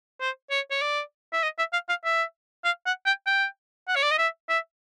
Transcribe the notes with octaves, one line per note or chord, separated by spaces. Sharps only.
C5
C#5
C#5
D5
E5
D#5
E5
F5
F5
E5
F5
F#5
G5
G5
F#5
C#5
D5
D#5
E5
E5